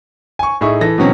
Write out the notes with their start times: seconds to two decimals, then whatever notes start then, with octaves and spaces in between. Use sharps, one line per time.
0.39 G#5 C#6
0.61 A2 D#4 G#4 E5 C#6
0.81 E3 A4 A#6
0.98 B2 D3 E3 F#3 C4 C#4